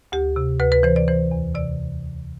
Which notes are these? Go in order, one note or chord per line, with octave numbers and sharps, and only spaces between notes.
D2 G4
C3
D2 B4
B4
E3 C5
D5
E3 C5
E2
C3 D5